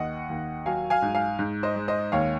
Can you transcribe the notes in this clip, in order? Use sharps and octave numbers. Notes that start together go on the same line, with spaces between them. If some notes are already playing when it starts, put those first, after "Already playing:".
Already playing: D#2 D#5 F#5
D#2
F#3 F5 G#5
F5 G#5
G#2
F5 G#5
G#2
C5 D#5
G#3
C5 D#5
D#2 C#5 F5